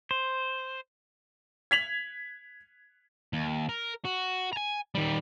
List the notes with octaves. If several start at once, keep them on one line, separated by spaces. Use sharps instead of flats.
C5
G#6 B6 F7 F#7
D#2
A#4
F#4
G#5 A#5
D#3 G3